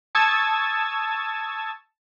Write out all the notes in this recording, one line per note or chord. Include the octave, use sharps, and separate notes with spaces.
A5 C#6 D#6 E6 G#6 A6